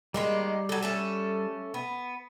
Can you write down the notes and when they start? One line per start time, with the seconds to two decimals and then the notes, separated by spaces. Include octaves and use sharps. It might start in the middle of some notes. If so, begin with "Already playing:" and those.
0.14 D#3 G3 G#3 A#3 C6
0.69 F#3 A4
0.82 A3 C#4 A4
1.74 B3